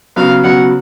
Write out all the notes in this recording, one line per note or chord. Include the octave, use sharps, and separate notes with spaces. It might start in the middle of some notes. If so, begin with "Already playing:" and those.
C#3 F#3 B3 F5
C#3 F#3 B3 F#5